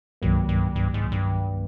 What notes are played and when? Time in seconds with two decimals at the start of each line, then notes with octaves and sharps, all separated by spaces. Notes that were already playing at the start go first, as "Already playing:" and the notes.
0.22 C2 G2 C3 D#3 F#3 A#3
0.49 G2
0.76 G2
0.94 G#2
1.12 G2